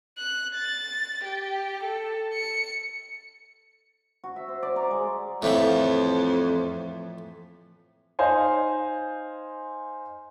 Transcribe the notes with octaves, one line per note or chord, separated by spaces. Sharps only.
F#6
A6
G4
A4
C#7
F#4
E5
C5
D5
A#5
G#3
F2 A2 E3 F3
D#4 C5 F5 G#5